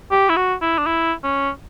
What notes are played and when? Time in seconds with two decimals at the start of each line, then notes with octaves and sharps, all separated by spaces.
0.11 G4
0.29 E4
0.37 F#4
0.62 E4
0.78 D4
0.87 E4
1.24 C#4